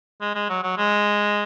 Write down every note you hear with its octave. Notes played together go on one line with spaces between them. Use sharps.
G#3
G#3
F#3
F#3
G#3